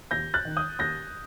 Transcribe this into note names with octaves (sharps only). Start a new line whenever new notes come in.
D#2 G6 A#6
F#6 A6
D#3
D#6 G6
D#2 G6 A#6